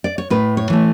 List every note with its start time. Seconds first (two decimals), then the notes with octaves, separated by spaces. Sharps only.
0.04 D5
0.18 C#5
0.30 A2 B4
0.57 C#5
0.70 E3 A3